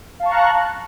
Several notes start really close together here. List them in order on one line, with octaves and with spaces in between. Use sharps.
F5 A5 C#6 A#5 F#6